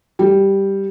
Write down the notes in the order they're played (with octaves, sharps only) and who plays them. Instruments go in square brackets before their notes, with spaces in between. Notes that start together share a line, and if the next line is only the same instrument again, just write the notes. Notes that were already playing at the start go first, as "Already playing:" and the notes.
[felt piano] G3